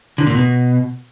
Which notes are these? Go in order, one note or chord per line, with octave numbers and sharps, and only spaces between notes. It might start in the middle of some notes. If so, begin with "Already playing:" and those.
D3
A#2
B2